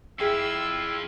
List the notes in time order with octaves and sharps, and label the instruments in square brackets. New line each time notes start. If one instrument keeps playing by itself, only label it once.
[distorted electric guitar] F2 [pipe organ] E4 F4 E5 [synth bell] G#4 G5 C7 [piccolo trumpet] E6